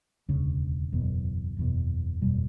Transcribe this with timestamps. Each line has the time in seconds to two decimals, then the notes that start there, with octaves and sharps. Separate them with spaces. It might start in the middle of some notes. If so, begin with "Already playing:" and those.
0.29 E1 D2 C#3
0.92 F#1 E2 B2
1.57 F#1 E2 B2
2.21 F#1 E2 B2 G3